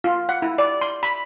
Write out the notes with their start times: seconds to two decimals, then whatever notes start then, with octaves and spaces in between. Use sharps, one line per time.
0.04 F4
0.29 F#5
0.42 E4
0.58 D5
0.81 C6
1.03 B5